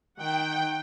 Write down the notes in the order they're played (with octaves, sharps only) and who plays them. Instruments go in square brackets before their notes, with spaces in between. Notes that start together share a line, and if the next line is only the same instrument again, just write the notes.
[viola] D#3 F#5 [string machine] G5